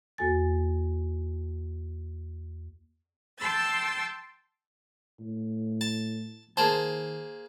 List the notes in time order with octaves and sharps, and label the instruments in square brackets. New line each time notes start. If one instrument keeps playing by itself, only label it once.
[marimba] E2 A#3 F#4 A4 G#5 A6
[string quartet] G5 A5 C6 E6 A6
[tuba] A2
[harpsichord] A5
[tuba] D#3 [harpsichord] A#3 G#4 C5 [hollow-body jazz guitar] A5